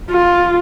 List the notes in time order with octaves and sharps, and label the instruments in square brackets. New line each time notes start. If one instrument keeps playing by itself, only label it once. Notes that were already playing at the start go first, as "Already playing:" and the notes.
[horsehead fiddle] F4